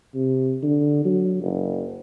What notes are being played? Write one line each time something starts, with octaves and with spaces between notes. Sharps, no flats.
C3
D3
F#3
F#1